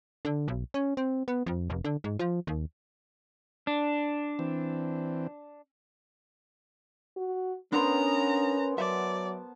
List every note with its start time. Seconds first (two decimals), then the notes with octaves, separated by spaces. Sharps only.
0.25 D3
0.48 B1
0.74 C#4
0.97 C4
1.28 B3
1.46 F2
1.70 F1
1.84 D3
2.04 G#2
2.19 F3
2.47 D#2
3.67 D4
4.39 E3 C4
7.17 F#4
7.73 B3 C#4 D4 A#4 C5 F#5 A#5
8.78 F#3 D5 E5 A5